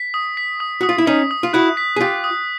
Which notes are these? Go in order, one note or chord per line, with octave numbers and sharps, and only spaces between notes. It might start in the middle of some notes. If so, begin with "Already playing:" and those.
Already playing: B6
D#6
B6
D#6
F#4 D#6
F4
E4
C#4 D#4 B6
D#6
F4
E4 F#4 F#6
B6
G#4
F4 G4 B6
D#6